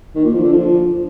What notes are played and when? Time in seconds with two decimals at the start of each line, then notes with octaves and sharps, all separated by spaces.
0.15 D#3
0.25 A#2
0.34 F3
0.43 D3
0.53 F3